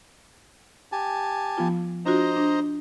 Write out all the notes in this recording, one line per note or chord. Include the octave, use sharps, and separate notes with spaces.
G4 G#5 A5
F3 B3 F4
D4 F4 F#4 C5 D#5 A#5
D4